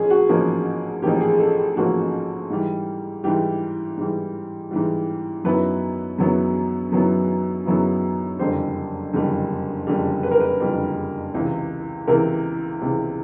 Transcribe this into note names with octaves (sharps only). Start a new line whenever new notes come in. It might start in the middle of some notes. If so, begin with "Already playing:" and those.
Already playing: A1 F3 C#4 G#4
F#4
A1 G#2 F3 A#3 C#4
A1 G#2 F3 A#3 C#4 G4
G#4
A4
G4
A1 G#2 F3 A#3 C#4 F#4
G#2 E3 G3
G#2 E3 G3 G4
G#2 E3 G3
G#2 E3 G3
F#2 D#3 F#3 B3 E4 B4
F#2 D#3 F#3 B3 E4
F#2 D#3 F#3 B3 E4
F#2 D#3 F#3 B3 E4
F#1 F2 D3 G3 C5
F#1 F2 D3 G3
F#1 F2 D3 G3
B4
A#4
B4
F#1 F2 D3 G3
C#2 C3 E3
C#2 C3 E3 A#4
C#2 C3 E3